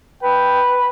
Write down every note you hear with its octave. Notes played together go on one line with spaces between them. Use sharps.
B4 G5